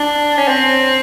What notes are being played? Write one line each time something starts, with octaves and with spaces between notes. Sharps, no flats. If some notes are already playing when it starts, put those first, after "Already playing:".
Already playing: D4
C#4
C4